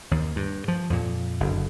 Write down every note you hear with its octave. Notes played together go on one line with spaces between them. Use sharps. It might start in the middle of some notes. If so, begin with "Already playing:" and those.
D#2
G2
F3
F2 A#2
F#1 D3